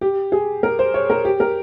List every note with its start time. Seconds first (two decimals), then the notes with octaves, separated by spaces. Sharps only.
0.01 G4
0.32 G#4
0.63 A#4
0.79 C5
0.94 C#5
1.10 A#4
1.25 G4
1.40 A#4